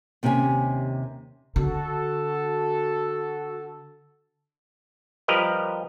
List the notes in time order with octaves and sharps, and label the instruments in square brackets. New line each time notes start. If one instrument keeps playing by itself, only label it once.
[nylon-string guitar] D#2 C3 C#4 C#5 G#5
[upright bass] D3 [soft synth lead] F#4 [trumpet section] A4
[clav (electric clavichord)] F3 G3 G4 A#4 B4 D#5